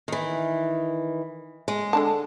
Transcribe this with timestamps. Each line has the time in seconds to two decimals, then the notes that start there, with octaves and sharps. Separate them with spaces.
0.08 D#3 E3
1.68 G#3
1.93 D3 D4 A5